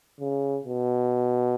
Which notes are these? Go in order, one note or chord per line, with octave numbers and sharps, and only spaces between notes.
C#3
B2